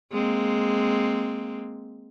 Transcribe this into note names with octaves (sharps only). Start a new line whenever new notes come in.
G#3 A#3 C4